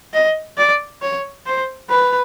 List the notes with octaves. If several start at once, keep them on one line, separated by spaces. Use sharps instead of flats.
D#5
D5
C#5
C5
B4